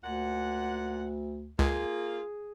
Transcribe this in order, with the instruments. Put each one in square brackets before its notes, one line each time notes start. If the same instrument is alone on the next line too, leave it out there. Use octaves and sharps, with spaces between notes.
[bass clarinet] D2 [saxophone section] A#2 F#5
[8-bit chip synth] C#2 [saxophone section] A#3 F4 [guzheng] G#4